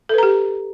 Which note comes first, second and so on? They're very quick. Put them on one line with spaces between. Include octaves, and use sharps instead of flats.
A4 B4 A#5 G4